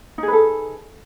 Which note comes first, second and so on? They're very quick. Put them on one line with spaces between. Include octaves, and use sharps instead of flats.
D#4 G#4 B4 A4